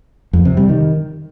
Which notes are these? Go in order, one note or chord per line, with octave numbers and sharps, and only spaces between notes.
F2
C3
G3
D#3